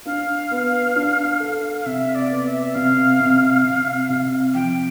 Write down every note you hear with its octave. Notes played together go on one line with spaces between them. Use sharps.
D4 F5
B3
D4
A4
F5
C3 E5
D5
B3
E5
C3 F5
C3
C3
C3
F3 G5